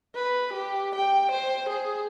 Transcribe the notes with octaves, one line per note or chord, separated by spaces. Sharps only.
B4
G4
G5
C5
G#4